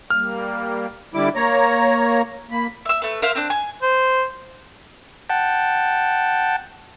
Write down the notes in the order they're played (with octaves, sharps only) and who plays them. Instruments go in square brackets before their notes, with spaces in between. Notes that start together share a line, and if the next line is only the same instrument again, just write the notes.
[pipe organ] G3 A#3 [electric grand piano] F6
[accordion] D3 G3 E4 D6
A#3 C#5 A#5
A#3 B5
[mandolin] E5 E6
A3 B4
A#4 C5 E5 F5
C4 D4 F#6
G#5
[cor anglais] C5
[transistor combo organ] F#5 G5 A5